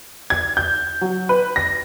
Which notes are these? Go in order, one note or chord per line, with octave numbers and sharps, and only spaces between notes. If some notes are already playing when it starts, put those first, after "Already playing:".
G#6
G6
F#3
B4
A#6